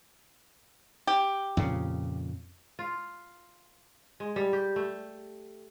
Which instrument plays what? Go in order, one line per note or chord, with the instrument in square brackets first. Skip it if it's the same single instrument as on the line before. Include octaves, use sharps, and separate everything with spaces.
[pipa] G4
[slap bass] F2 A#2 C#3
[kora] F4
G#3
G3
G4
A3